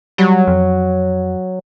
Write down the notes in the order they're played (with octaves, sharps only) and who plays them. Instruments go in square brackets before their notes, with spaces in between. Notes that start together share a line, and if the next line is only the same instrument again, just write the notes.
[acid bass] F#3 [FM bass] G3
[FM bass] F2